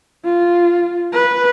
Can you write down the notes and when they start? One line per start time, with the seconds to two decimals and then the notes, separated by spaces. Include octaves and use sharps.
0.25 F4
1.13 B4